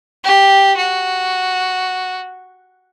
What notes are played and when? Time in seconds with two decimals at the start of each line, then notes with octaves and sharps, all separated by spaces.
0.24 G4
0.77 F#4